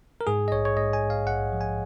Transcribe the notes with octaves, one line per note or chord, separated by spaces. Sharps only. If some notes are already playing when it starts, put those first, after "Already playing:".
A#4
G#2 G#4
D#5
A#1 C#5
C#5
G#2 D#5
G#5
G#2
F5
A#1 F#5
F3
G#5